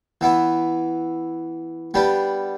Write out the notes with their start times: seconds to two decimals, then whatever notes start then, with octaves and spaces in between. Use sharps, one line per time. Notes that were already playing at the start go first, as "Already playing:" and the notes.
0.21 E3 B3 E4
1.94 G3 B3 D4 G4